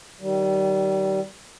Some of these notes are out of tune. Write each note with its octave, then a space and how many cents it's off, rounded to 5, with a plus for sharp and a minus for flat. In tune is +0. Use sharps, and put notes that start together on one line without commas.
D#3 +0 G3 -30